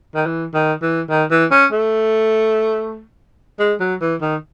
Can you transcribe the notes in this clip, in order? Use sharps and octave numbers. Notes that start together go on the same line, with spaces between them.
D#3
E3
D#3
E3
D#3
E3
C#4
A3
G#3
F#3
E3
D#3